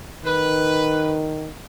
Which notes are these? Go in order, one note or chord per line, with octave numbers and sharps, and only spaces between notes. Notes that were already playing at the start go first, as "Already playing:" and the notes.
D#3 B4